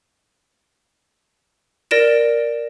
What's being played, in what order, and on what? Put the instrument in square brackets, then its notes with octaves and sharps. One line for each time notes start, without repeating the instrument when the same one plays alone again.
[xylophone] A#4 D5 A#6 D7 E7